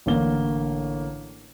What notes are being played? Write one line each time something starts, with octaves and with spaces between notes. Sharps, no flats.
A1 D3 A#3 G7